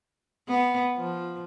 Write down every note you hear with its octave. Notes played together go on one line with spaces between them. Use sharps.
B3
F3